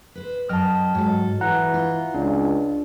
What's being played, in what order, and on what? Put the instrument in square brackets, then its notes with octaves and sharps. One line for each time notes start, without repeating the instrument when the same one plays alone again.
[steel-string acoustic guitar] B4 C5
[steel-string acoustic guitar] F#2 D#5 G5 [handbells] A5 F6
[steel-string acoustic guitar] G#2 A4 [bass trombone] F#3
[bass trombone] E3 [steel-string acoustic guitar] G#4 [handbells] F#5 A#5 F#6
[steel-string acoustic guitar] F4
[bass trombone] C#2 [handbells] D4